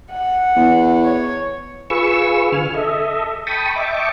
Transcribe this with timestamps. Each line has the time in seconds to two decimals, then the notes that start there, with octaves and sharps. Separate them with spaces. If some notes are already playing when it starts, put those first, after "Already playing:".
0.12 F#5
0.56 E2
1.05 C#5
1.90 F4 G#4 B4 C#6 E6
2.52 D3 G#5 F6
2.74 A4 D#5 E5
3.47 G5 A5 B5 C#6 D#6
3.76 D#5 E5 G5 A5 C#6 D6